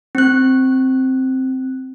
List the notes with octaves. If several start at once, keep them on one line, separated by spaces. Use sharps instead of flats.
C4 F#6